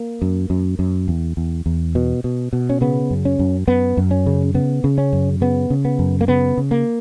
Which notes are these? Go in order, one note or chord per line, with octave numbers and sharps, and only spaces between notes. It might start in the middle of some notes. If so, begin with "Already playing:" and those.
Already playing: A#3
F#2
F#2
F#2
E2
E2
E2
B2
B2
B2
C#4
C#3 B3
F#2
C#4
F#2
F#2 B3
F#2
C#4
C#3
C#3 B3
C#3
C#4
F#2
C#3 B3
C#3
B3
F#2
A#3
C#3 B3
C#3
A#3